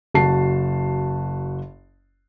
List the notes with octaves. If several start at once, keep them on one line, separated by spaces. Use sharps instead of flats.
F#1 F#4 A5 C7